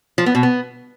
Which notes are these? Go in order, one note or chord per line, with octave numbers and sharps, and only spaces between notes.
F3
B3
B2
B3